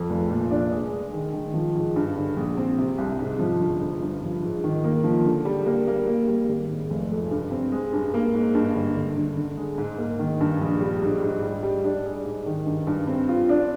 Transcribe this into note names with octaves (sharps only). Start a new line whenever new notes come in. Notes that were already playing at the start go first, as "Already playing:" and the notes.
Already playing: F2
F1
A#2
D4
G#3
G#3
D#3
D#3
F3
G#2
G2
D3
A#1
C4
C3
C2
G#2
F3
G1
G1
G2
F3
G#2
D#3
A#3
F3
D3
G3
A#3
A#3
A#3
G3
G#1
G#2
F1
F2
G2
C4
G#3
G2
A#3
G#2
G2
G1
D3
D3
D3
G#3
G#2
A#3
D#3
G2
A#1
G3
G#2
G#2
G3
G3
D4
G#4
G#2
D#3
G2
G2
C4
F4
D4